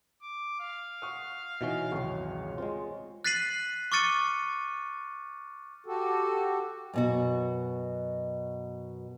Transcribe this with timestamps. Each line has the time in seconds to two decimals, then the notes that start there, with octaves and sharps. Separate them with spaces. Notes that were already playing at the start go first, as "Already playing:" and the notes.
0.22 D6
0.60 F5
1.02 F#5 C#6 D#6
1.61 B2 E3 C#4 D#4 D#5 E5
1.91 G#1 C#2 F#2 C#5 C#6
2.58 G#3 C4 F4
3.24 F#6 A6 B6 C7 D#7 F#7
3.92 C#6 D6 F6 A6 C#7 D#7
5.86 F#4 G4 A4
6.93 F#2 B2 F#4